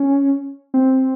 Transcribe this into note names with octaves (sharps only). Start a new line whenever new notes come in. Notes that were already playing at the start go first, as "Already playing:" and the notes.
Already playing: C#4
C4